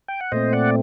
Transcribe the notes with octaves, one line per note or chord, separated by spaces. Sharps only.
G5
F#5
A#2 A3 C4 C5 D#5
D5 F#5